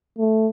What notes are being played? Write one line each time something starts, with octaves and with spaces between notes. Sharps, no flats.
A3